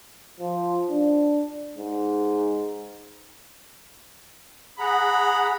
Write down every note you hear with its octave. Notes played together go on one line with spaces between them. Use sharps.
F3
D4
G#2
G#4 F#5 A#5 B5